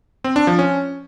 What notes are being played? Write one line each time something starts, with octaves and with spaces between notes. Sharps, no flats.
C4
D4
F3
C#4